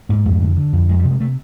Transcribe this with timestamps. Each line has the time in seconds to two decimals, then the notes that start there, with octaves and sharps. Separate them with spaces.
0.09 G#2 A#3
0.25 F2 A3
0.41 D3
0.57 D3
0.73 F2
0.89 F2 G#3
0.99 G3
1.05 C3
1.10 G#3
1.20 C3 A3